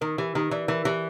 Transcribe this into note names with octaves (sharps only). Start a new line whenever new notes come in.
D#3 A#4
E3 G4
D#3 G4
E3 D5
E3 A#4
E3 G4